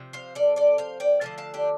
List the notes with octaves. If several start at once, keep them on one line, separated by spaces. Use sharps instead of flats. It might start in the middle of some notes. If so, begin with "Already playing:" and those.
Already playing: C3 F3
C5 F5
A4 D5
A4 D5
C5 F5
D5 G5
D3 F3 A3 F5 A5
F5 A5
D4 G4